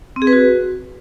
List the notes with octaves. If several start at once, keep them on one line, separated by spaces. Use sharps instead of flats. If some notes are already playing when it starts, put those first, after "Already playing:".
C4
G#4
B4
F#4